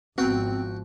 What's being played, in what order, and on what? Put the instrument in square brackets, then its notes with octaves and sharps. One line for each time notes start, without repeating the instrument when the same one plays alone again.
[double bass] G#1 F3 [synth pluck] B3 [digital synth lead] C4 [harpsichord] F#4 G5